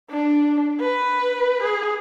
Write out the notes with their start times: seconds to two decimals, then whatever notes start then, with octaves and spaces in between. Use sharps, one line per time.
0.11 D4
0.80 B4
1.63 G#4